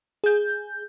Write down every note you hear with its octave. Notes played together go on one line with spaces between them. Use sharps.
G#4 G6